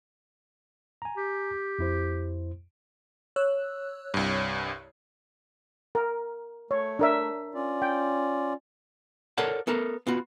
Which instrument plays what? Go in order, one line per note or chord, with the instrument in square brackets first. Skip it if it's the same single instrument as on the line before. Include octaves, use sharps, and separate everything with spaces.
[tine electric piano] G#5 A#5
[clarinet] G4
[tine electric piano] F2 E4 C5
[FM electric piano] C#5 E6 F#6
[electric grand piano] C2 G2
[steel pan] A#4
[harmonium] A3 [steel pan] C#5
[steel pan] D4 A#4 E5
[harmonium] C#4 F4 D5
[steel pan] G5
[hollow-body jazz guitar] A4 A#4 C#5 D5 F#5 A5
B3 A4 A#4
B3 F4 F#4